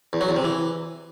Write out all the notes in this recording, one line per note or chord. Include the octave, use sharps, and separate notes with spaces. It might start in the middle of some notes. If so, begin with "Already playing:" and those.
E2
F#3
E2
C3
E3